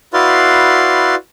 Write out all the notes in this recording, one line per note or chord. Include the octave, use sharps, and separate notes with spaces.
E4 F#4 B4 D5 F5 C6